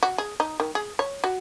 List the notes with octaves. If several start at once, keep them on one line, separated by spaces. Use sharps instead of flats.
F#4
G#4
D#4
D#3
G#4
C#5
F#4